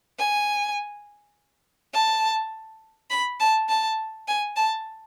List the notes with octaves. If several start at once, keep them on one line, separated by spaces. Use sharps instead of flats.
G#5
A5
B5
A5
A5
G#5
A5